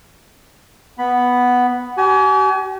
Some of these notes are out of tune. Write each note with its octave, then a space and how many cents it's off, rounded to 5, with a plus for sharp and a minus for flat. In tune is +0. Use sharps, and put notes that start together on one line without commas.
B3 +0 B5 +0
G4 -45 G#5 +25